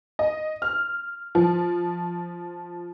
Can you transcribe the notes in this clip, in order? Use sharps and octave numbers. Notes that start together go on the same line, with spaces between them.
D#5
F6
F3